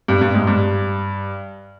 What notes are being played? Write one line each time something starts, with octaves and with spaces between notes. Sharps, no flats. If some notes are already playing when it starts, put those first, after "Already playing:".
G2
G2
G#2
G2